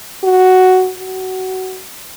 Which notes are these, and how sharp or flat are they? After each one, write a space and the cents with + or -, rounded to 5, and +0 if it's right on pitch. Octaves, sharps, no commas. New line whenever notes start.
F#4 +5
F#4 +20